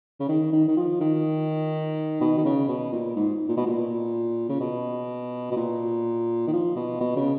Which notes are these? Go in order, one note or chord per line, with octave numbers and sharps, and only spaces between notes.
C#3
D#3
D#3
D#3
F3
D#3
B2
D#3
C#3
B2
A#2
G#2
A#2
B2
A#2
C#3
B2
B2
A#2
D#3
F3
B2
B2
C#3